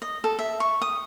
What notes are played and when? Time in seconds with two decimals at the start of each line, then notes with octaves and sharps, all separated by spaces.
0.02 D#5
0.24 A4
0.39 E5
0.60 C#6
0.82 D#6